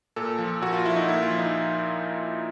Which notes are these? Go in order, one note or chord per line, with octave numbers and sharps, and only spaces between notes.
A#2 A4
F3
A#2 F#4
F4
F3 E4
D#4
A#2 E4
F4
F3
D#4